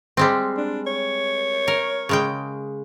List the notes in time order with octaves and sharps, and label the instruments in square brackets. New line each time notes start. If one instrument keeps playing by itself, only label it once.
[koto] G3 G#3 C4
[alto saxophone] D4
C#5
[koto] A#4
C#3 G#3 G5